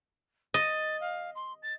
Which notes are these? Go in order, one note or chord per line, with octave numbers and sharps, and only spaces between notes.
D#5 A6
F5
C6
A6